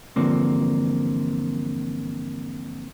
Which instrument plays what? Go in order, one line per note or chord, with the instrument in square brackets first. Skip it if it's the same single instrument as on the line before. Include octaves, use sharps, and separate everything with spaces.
[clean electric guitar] E2 G2 D3 F3 A#3 C4